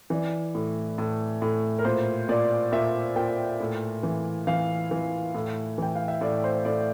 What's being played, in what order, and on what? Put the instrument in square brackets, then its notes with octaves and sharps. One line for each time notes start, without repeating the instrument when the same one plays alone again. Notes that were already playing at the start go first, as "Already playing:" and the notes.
[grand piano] E3 D5
A2
A2
A2
A#4
A#2 C5
A#2 D5
A#2 E5
A#2 G5
A2
E3
E3 F5
E3
A2
E3 G5
F5
E5
A2 D5
C5
A2 D5